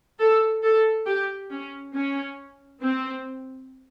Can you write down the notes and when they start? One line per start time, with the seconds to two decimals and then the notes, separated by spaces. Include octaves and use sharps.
0.19 A4
0.63 A4
1.06 G4
1.51 C#4
1.93 C#4
2.81 C4